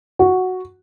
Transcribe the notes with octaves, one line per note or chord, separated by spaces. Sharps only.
F#4